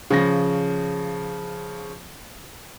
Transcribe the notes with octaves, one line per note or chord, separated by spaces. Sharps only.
C#3 F3 A#6